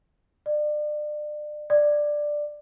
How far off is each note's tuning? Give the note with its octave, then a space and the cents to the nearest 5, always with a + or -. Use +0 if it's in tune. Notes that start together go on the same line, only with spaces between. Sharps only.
D5 +30
D5 +10